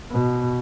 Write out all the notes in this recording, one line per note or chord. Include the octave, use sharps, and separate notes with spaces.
B2